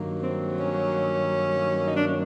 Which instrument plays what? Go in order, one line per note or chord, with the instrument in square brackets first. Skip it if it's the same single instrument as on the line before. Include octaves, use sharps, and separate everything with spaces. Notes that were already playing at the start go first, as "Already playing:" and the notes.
Already playing: [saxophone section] G2 D#3 F#3 A#3
C4
C#4
D#4
D4
C#4